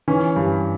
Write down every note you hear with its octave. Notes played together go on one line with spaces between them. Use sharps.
E3 C#4
G2